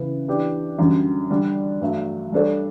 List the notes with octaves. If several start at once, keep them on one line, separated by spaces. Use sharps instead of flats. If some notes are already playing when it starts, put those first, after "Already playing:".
Already playing: C#3 E3 B3
E3 B3 D4 G4
F#2 D3 G3
D3 G3 D4
G2 F#3 A3
G3 D4 A4 C#5